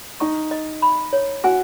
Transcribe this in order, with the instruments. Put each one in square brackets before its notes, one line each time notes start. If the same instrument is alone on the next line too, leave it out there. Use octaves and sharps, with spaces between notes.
[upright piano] D#4 [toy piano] C#6
[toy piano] D#5
B5
C#5
[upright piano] F#4 [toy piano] G#5